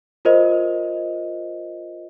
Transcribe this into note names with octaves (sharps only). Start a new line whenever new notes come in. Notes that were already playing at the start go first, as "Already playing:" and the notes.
F4 A#4 C5 D#5